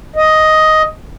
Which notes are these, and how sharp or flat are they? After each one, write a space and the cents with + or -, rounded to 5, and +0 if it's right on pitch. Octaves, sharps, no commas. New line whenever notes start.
D#5 +5